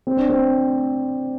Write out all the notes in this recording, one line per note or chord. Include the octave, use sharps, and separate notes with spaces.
C4
D4
C4